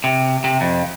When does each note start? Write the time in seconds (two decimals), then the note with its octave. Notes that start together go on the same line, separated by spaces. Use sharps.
0.04 C3
0.44 C3
0.61 F2